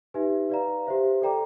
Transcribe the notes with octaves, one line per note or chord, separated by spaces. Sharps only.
D#4 G4 B4 E5 G#5
B4 D5 F5 A#5
G4 C5 E5
A4 D5 G5 A#5 D6